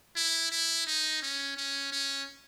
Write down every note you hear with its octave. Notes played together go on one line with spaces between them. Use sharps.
E4
E4
D#4
C#4
C#4
C#4